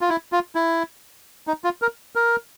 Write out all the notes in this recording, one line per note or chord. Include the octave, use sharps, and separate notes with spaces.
F4
E4
F4
E4
D#4
F4
A#4
A#4